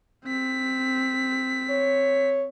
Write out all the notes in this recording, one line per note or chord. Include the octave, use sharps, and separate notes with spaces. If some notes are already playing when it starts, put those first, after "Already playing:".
C4 B6
C#5